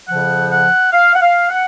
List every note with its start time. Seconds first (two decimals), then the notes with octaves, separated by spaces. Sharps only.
0.08 F2 C#3 F3 F#5
0.51 F#5
0.93 F5
1.14 F#5
1.21 F5
1.49 F#5